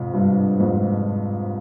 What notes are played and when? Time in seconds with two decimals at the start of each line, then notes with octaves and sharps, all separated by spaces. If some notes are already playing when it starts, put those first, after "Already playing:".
Already playing: F2 G#2 C3
0.14 G2
0.60 F2 G#2